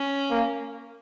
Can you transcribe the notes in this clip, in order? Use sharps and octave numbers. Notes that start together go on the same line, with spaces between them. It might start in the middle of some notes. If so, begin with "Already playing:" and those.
Already playing: C#4
A#3